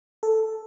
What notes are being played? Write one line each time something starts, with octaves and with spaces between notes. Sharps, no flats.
A4